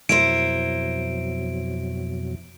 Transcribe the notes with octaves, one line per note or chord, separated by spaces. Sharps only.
F2 B2 F#3 E4 A#4 C5 D7